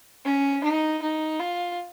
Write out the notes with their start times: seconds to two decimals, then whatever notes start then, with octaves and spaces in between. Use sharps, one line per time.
0.25 C#4
0.63 D#4
1.02 D#4
1.40 F4